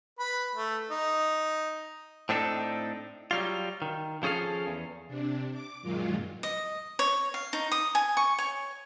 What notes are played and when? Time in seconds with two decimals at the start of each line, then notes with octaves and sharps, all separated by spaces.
0.19 B4 B5
0.55 A3
0.91 D#4
2.29 A2 C4 D4 D#4 A4
3.31 F#3 G3 F4
3.82 D#3
4.23 F3 C#4 G#4 A4 F5
4.67 E2
5.08 C3 D4
5.51 D6
5.82 F#2 A#2 D#3 F#3 G#3 F4
6.43 D#5
6.99 C#5
7.34 F5
7.53 D#4
7.72 D#6
7.95 G#5
8.17 C#6
8.39 C#5